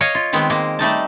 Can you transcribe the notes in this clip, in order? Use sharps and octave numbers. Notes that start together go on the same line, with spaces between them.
C#5 D#5 F5
F4
D#3 G#3 B3 C4
G#3 A#3
G3 A3 D#4 A5